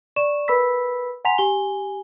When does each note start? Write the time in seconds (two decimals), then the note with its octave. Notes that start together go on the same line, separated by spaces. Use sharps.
0.16 D5 C#6 E7
0.48 A#4 B4 B5 E6 B6
1.25 F#5 G#5 A#5 C6 B6 F7
1.38 G4 G#5 G7